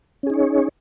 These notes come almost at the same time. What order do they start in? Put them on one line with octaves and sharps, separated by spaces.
C#4 G#4 D#4 C#5